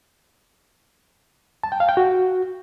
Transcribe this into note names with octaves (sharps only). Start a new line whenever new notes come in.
A5
G5
F5
G5
F#4